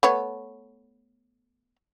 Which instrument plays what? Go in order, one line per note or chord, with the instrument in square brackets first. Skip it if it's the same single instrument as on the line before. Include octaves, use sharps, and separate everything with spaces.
[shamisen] A3 B3 C#5